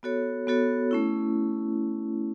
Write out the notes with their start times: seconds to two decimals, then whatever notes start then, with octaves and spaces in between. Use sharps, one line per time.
0.03 B3 F#4 A4 C#5
0.47 B3 F#4 A4 C#5
0.91 A3 C#4 E4